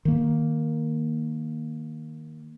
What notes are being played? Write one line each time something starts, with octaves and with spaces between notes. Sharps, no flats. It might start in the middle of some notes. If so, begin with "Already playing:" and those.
D#3 A#3